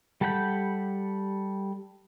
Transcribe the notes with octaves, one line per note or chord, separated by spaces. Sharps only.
G3 A4 F#5 B5 G6